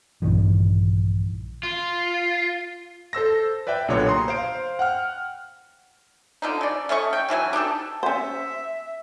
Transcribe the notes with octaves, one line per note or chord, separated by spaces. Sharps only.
A#1 G2 D#3 E3
F4
A4 C5 E6 A#6
B4 D5 E5 G5
B1 A#2 D3 G4 A4 C#5
A#5 C6 D#6
C5 F5 D7
F#5 G5 F6
D3 F3 D#4
C#3 D5
A3 C#4 D#5 C#6
G5
C#3 E3 F#3 G#5
D4 D#4 G4 A4
C#4 C5 E5